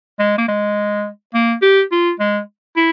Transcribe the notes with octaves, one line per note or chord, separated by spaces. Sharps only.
G#3
A#3
G#3
A#3
G4
F4
G#3
E4